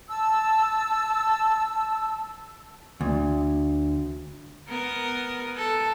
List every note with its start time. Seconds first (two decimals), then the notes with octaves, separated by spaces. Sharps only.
0.09 A5 E6
3.01 D2
4.69 B3 A#4
5.56 A4